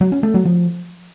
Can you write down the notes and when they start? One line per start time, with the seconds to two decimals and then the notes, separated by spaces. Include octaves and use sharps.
0.01 F#3
0.12 C#4
0.23 A3
0.34 F#3
0.45 F3